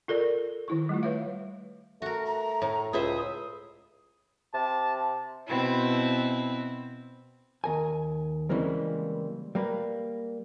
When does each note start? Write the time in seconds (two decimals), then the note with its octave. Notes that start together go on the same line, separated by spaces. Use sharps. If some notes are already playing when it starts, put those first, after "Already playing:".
0.08 F4 A4 A#4 D5
0.68 D#3 E4 C#6
0.89 G3 A3 F4
1.03 B4 C#5 E5 F5
2.02 A3 F#4 A#4
2.26 A#5
2.62 A2
2.93 C#2 E4 C5 E5 D#6
4.54 C3 A5
5.47 B2 C4 E4
7.64 D#2 A#4 G#5
8.49 C#3 E3 G3 G#3 A#3 C4
9.55 G3 A#3 B4